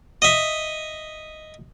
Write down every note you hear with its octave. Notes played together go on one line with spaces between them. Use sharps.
D#5 E5